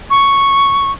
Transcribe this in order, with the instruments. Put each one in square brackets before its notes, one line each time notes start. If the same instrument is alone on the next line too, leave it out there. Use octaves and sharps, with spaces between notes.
[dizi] C#6